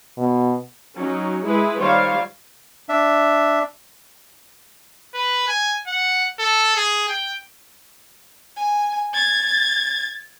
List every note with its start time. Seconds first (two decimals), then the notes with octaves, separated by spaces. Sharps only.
0.18 B2
0.95 F#3 C#4 D#4
1.44 G#3 E4 G#4 B4
1.77 D#3 G3 F4 C5 C#5 F5
2.89 D4 E5
5.15 B4
5.48 G#5
5.87 F#5
6.39 A4
6.77 G#4
7.09 G5
8.56 G#5
9.12 G#6 A6